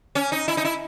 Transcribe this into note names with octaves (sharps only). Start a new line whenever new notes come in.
C#4
D#4
E4
D#4
E4